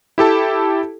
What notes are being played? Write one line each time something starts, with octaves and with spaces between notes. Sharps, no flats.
E4 G4 A4 A5